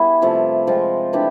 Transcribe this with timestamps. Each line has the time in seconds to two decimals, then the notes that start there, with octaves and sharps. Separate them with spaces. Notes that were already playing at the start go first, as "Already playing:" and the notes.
Already playing: G3 B3 E4 G#4
0.22 C3 F3 A3
0.67 F3 G#3 C4 F4
1.13 E3 A3 D4 G4